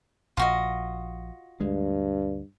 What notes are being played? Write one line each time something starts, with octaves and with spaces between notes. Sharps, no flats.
A#1 F4 F#4 D#5
D2 G2 G#3